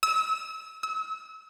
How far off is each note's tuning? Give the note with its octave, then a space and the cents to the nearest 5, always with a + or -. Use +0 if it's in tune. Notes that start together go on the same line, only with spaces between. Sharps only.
E6 -35
E6 -35